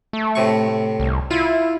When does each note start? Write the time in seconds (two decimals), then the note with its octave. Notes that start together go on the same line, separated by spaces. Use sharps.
0.13 A3
0.35 A2 C3 C#6
1.00 C2
1.31 E4 F4